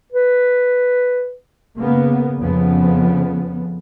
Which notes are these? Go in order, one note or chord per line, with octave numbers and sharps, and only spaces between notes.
B4
C#3 A#3 B3
F2 C#3 F3 B3